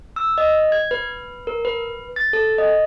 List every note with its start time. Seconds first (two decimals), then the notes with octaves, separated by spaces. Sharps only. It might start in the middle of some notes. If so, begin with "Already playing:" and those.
0.16 E6
0.38 D#5
0.72 G#6
0.91 B4
1.47 A#4
1.65 B4
2.16 A6
2.33 A4
2.58 D#5